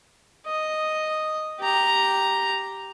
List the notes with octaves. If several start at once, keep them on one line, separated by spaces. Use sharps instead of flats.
D#5
G4 A#5